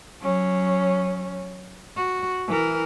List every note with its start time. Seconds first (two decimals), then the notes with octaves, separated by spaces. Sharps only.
0.20 F#3 C#4
1.97 F#4
2.48 E3 A#4